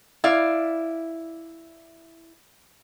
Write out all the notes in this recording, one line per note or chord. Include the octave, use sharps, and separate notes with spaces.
E4 D5 F5